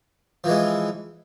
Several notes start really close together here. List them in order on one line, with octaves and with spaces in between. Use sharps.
F3 E3 G#3